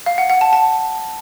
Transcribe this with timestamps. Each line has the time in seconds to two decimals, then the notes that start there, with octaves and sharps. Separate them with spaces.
0.06 F5
0.18 F#5
0.30 F#5
0.41 A5
0.53 A5